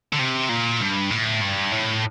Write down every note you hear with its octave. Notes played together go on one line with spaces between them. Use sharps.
D3
C3
A#2
G2
A2
G2
A2